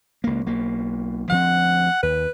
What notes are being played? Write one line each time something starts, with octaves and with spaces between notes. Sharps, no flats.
C#2 A#3
B1 A#3
D2 F3 C4 F#5
D#2 B4